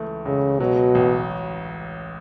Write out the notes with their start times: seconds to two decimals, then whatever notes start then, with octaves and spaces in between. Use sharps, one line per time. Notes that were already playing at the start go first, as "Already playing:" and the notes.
Already playing: C#2 E3 A3
0.25 C#2 C#3
0.59 B2 F#3
0.95 A1